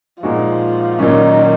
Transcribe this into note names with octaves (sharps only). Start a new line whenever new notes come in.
A#2 F3 G#3 D#4 F#4
A#2 D#3 F#3 A#3 C#4